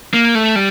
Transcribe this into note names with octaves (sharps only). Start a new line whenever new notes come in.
A#3
A3
G3